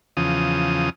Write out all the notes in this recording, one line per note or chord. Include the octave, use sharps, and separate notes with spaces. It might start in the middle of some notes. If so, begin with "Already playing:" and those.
E2 C#3 F3 D#6